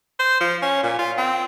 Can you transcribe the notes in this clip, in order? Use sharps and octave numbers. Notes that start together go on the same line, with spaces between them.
C5
F3
C#4
A#2
F4
C4